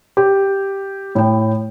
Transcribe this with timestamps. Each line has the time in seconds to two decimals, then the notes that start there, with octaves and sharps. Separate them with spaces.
0.17 G4
1.15 A2 G5